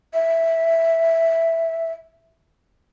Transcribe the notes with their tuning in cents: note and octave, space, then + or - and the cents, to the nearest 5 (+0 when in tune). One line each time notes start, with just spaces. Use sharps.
E5 +0